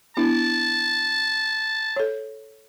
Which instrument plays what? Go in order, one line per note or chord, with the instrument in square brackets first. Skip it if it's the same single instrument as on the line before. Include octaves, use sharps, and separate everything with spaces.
[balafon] B3 D4 E4 [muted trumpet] A5
[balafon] A4 C#5